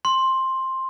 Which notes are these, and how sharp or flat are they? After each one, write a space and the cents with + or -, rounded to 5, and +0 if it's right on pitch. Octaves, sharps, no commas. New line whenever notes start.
C6 +10